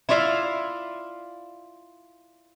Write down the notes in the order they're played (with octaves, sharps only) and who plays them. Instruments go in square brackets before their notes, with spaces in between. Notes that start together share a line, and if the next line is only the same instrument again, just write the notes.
[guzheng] E4 F4 D5 E5 F5